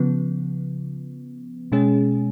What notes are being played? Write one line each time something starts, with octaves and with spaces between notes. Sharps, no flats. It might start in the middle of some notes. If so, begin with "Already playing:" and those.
Already playing: C#3 F3 B3
B2 G#3 C#4 G#4